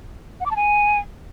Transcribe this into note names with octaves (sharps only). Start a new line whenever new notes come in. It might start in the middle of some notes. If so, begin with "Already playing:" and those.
F#5
D6
A5
G#5